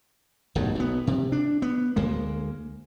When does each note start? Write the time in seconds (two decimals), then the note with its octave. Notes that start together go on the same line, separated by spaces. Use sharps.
0.55 D1 B1 G2
0.75 B1 B3
1.07 C3
1.32 D4
1.62 B3
1.96 D2 G#3 A#3